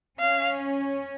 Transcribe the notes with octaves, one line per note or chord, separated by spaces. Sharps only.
C#4 F5